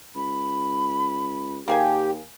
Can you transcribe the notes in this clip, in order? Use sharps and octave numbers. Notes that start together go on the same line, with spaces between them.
C#2 B5
D#2 A#3 G4 G#4 G#5